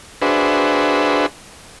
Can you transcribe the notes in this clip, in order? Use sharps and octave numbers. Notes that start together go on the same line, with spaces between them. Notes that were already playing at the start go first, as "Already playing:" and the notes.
D4 F#4 G#4 B4 C5 E5